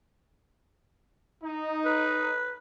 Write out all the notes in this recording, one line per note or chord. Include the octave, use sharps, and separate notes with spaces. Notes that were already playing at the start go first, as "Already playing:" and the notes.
D#4
B4